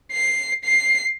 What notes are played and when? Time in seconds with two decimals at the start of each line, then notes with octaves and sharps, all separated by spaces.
0.13 C7
0.65 C7